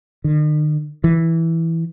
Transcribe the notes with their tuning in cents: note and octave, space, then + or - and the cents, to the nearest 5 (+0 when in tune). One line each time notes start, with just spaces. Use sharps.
D#3 -45
E3 -5